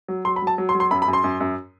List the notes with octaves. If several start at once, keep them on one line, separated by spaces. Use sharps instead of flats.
F#3
F#3 C6
B5
F#3 A5
F#3
C6
F#3
C6
F#2 B5
B5
F#2
C6
F#2
F#2